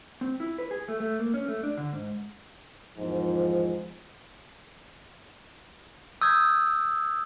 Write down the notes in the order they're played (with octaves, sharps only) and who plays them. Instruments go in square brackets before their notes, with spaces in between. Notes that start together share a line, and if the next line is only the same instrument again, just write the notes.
[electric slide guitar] C4
E4
B4
G#4
A3
A3
A#3
C#4
A3
D4
D3
G#2
[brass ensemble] E2 G#2 D#3 F3
[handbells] D#6 G6 G#6 [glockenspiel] E6